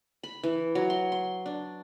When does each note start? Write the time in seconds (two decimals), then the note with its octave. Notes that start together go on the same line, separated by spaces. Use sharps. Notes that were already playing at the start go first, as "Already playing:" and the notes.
0.23 B5
0.43 E3
0.75 F#3
0.90 C6
1.12 C6
1.46 D4